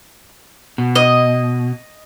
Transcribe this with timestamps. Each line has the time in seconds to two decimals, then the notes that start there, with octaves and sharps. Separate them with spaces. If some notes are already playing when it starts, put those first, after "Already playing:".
0.78 B2
0.95 D#5